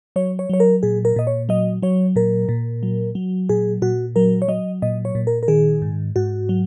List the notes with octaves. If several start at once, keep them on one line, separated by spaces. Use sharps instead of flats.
F#3 C#5
C#5
F#3 C#5
A#4
A#2 G#4
A#4
A#2 D#5
C#5
F#3 D#5
F#3 C#5
A#2 A#4
A#2
F#3
F#3
A#2 G#4
A#2 F#4
F#3 A#4
C#5
F#3 D#5
A#2 D#5
C#5
A#2
A#4
A#4
D#3 G#4
G#2
G#2 F#4
F#3